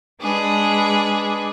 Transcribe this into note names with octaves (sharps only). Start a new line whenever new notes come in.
G#3 D4 G#4 B4